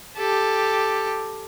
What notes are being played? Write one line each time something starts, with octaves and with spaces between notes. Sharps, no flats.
G4 A4